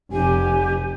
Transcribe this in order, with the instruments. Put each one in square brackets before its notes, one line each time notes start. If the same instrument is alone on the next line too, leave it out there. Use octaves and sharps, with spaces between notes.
[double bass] F1 [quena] G4 [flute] G#5